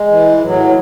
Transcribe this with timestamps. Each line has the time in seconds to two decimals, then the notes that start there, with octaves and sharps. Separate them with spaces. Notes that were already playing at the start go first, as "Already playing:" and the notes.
Already playing: G#3
0.09 E3
0.42 A2 F#3